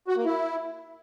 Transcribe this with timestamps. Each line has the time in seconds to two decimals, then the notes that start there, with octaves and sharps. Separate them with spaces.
0.08 F#4
0.17 A#3
0.25 E4